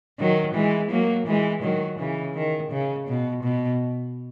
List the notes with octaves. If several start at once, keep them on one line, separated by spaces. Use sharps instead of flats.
D#3 F#3
E3 G#3
F#3 A#3
E3 G#3
D#3 F#3
C#3 E3
D#3
C#3
B2
B2